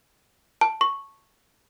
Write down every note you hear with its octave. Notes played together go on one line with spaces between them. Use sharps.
A5
C#6